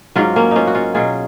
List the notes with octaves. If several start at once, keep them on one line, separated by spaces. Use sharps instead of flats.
G#2 F#3 C#4 F4
A#3 C#4
C#4 D#4 F4
F#4
C#4 F4
B2 F#3 F4 G#4